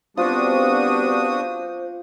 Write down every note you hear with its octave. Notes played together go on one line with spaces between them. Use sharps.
G3 B3 C4 D4 F4 F#4 C5 D#6